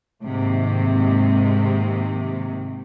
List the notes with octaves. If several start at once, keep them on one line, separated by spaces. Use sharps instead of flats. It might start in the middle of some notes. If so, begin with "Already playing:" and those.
G#2 C3 D#3 A#3